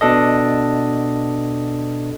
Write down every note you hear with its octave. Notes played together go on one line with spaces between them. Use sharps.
B2 D4 A4 D#5